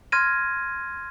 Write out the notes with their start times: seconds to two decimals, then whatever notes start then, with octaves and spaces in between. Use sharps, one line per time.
0.12 C6 F6 G#6 A#6 D#7